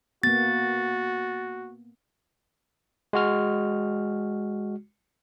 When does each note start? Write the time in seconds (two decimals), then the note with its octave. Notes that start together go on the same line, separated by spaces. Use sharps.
0.23 A#3 B3 F#4 A6
3.13 G#3 F#4 F6